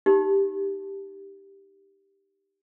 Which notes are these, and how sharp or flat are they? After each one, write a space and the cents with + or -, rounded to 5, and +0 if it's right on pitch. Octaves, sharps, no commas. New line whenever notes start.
D#4 +0 G4 +0